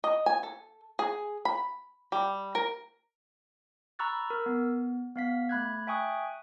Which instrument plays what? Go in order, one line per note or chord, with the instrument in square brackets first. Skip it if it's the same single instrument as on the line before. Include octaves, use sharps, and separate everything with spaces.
[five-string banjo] D#5
G#5
A4
G#4
B5
G3
A#4
[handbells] A#5 B5 C#6 E6 F#6 A6
A#4 E6
B3
B3 F5 B6
A3 B5 F#6 G#6
E5 G5 G#5 C#6 D#6 F#6